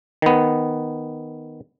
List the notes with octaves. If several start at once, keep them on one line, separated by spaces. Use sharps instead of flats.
D#3 B3